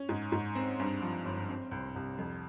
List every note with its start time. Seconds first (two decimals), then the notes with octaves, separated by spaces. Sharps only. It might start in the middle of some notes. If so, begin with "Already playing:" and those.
Already playing: C#4
0.09 G#2
0.32 G#2
0.55 C4
0.80 G2
1.02 F3
1.25 G1
1.49 C4
1.71 C2
1.96 C2
2.18 F2